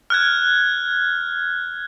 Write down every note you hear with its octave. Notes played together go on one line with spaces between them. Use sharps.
F6 F#6 G#6